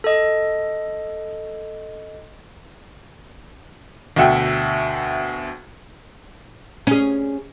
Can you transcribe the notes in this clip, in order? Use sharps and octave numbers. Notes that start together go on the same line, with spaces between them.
A4 D#5
D2 B2 E5 F#5 G5
C#4 G#4